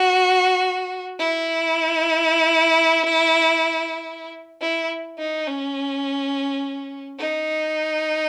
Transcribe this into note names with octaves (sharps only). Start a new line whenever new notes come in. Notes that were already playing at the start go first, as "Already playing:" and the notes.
Already playing: F#4
E4
E4
D#4
C#4
D#4